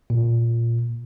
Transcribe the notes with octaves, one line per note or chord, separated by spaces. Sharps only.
A#2